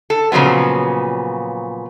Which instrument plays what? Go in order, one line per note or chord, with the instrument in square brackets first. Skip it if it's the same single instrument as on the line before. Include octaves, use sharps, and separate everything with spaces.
[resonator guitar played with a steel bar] A4
A#2 C#3 F3 F#3 B3